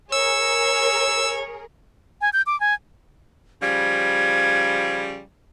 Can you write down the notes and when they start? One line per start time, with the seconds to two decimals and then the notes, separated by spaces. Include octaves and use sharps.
0.12 G#4 A#4 C#5 E6
2.21 G#5
2.33 G6
2.46 D6
2.60 G#5
3.62 C#3 F3 G3 G#6